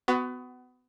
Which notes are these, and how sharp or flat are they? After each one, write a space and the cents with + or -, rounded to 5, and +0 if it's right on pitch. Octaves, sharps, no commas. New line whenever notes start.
B3 +25 F#4 +0